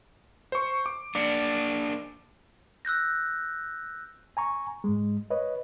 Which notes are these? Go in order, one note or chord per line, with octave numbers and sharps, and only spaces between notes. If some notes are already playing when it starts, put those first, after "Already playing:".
C5 C#6
D6
A#3 D4 D6 C#7
E6 F#6 G6 A#6
G#5 A#5 C#6
G#2 G#3
B4 C#5 D#5